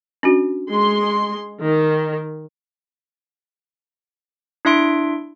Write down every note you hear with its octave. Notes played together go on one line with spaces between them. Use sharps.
C#4 D4 F#4
G#3 C6
D#3
D4 E4 E5 C6 D7